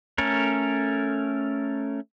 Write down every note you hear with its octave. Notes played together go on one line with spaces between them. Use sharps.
A3 C#4 A4 A#4